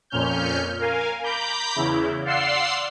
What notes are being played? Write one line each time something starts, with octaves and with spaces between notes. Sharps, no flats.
F2 A#2 C#4 F6 G6
A#4 F5 G#5
A#5 B5 D6 G6
E2 C#3 E4
D5 F5 F#5 C6 E6 C7